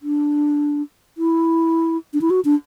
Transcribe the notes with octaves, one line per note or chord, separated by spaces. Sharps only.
D4
E4
D4
E4
F#4
D4